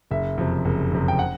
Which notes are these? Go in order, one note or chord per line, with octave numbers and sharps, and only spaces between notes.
F#1 E5
F2 C3
F#1
F2 C3
G5
F#5